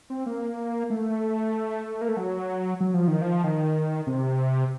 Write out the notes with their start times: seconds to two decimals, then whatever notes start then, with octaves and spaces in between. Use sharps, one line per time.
0.10 C4
0.26 A#3
0.90 A3
2.01 A#3
2.08 A3
2.17 F#3
2.81 F#3
2.94 F3
3.08 D#3
3.22 F3
3.44 D#3
4.07 C3